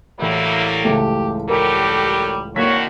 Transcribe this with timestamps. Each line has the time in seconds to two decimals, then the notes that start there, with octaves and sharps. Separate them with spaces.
0.20 A1 F#3 G3 A#3 E4 G6
0.84 C#2 A3 G4 A5 D7
1.49 F#3 G3 G4 A4 A#4
2.56 D3 D#3 A#3 C4 E4 F#4 C#5 B6